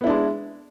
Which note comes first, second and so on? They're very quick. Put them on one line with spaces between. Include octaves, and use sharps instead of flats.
B3 E4 D4 G#3